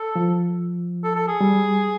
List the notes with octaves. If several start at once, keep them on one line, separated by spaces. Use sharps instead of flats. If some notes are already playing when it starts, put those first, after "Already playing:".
Already playing: A4
F3
A4
A4
G#4
G3